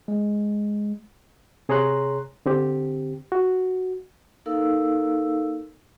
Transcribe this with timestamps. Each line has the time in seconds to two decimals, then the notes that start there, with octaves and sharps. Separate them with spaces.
0.08 G#3
1.69 C3 G#4 C#5 A#5 C6 F#6
2.46 D3 C4 G4
3.32 F#4
4.46 A#3 D#4 A4 A#4 F5 E6